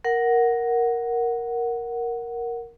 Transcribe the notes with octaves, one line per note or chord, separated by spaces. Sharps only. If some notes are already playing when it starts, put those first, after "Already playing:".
A#4 F#5